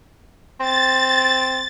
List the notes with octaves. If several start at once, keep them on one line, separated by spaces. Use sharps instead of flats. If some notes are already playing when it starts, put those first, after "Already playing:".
C4 A6